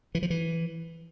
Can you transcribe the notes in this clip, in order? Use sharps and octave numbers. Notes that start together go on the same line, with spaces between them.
E3
F3
E3